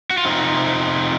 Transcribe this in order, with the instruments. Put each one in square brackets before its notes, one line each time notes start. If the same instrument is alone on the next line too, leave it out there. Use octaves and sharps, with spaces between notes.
[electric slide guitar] F#4
F4
F2 C3 F3 C4 D#4